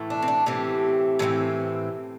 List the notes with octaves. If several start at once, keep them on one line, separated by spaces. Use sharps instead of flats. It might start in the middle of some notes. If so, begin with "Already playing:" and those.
Already playing: A2 E3 A3
D4
C4
D4
A2 E3 A3 C4 G4
A2 E3 A3 C4